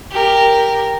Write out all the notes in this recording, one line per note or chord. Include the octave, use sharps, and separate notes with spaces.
G4 A#4